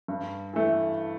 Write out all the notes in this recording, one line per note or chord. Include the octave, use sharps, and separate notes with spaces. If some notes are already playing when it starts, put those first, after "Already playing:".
G2
E3 A3